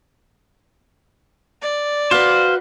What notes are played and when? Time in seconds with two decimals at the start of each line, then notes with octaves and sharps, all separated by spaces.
1.62 D5
2.11 F#4 B4 C5 F5